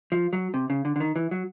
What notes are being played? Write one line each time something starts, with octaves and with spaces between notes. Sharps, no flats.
F3
F#3
C3
C#3
D3
D3
D#3
E3
F#3